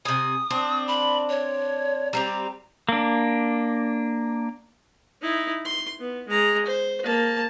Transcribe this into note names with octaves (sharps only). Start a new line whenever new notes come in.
C3 G#5 D#6
C4 D4
B5
C#5
G3 C4 G4 A#5
A#3 D4
D#4 E4
C6
B3
G#3 A#5
C5
A#3 A5